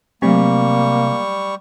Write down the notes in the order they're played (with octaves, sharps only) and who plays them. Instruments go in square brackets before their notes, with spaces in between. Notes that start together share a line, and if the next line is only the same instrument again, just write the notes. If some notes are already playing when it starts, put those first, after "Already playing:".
[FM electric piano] C3 [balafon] F#3 A3 [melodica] G3 C#6 [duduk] A#3